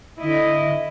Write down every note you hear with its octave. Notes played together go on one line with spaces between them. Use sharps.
D3 E4 D#5